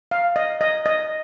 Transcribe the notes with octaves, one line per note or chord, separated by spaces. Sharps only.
F5
D#5
D#5
D#5